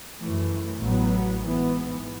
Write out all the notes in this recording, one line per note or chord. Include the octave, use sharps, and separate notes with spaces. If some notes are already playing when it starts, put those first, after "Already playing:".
F#2 E3 A3
A1 A2 F#3 B3
G#2 E3 B3